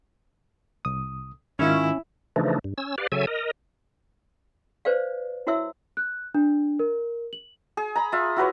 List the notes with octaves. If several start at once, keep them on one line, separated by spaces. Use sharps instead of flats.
C2 D#6
G#2 D#3 C#4 E4 F4
C#3 E3 F3 A3 D4 D#4
G2
C#4 E6
G4 B4 D5 F5
C#3 F#3 A4 E5 G#5
A#4 D#5
B4 C5 D5 F5
E4 F#4 C#5 E5 E6
F#6
D4
A#4
F#7
G#4
A#5 B5
F4 E5
E4 F#4 B4 C#5